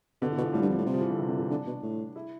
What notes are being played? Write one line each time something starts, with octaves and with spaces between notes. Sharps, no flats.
B2 D3
E3
B2
F3
A2 G3
G2
F2
A2
C3
F3
E3
D3
C3
D3
E3
D3 D4
B2
A2
E4